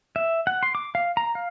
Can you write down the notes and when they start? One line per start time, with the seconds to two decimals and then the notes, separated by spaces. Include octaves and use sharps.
0.16 E5
0.47 F#5
0.63 C6
0.75 D6
0.95 F5
1.17 A#5
1.35 F5